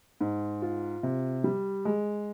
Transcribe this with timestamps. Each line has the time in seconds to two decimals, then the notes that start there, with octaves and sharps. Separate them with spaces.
0.21 G#2
0.62 F4
1.03 C3
1.44 G3
1.85 G#3